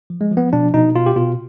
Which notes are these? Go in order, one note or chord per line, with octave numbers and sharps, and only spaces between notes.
F3
G#3
F3
B3
B2 D4
B2 D#4
B2 F4
G4
B2 F4